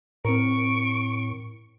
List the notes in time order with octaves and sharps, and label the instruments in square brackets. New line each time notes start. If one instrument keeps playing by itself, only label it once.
[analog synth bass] A2 [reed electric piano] C4 A#4 [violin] C#6 D7